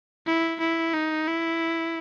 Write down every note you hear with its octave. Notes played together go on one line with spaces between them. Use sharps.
E4
E4
D#4
E4